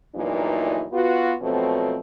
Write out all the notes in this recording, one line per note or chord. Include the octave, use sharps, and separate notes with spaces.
E2 G2 A#2 E3 F#3 D#4
B3 F4 F#4
B2 F3 F#3 A3 C4